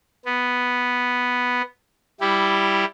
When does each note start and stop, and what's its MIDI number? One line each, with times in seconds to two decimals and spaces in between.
0.25 1.62 59
2.21 2.85 55
2.21 2.85 64
2.21 2.85 67